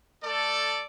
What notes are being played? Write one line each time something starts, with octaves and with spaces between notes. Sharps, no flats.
A3 A4 D5